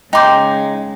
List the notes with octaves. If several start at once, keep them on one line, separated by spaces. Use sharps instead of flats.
C#3 G#3 D#4 G5 C6 D6 G6